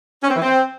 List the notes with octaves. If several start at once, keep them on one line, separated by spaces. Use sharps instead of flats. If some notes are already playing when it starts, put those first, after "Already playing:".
C#4
C4
E3
C4